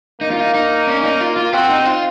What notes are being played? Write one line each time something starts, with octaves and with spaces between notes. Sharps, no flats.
A#3 D#4
F4
D#4
D#4
C#4
D#4
F4
F4
C4 F#4
D#4
F4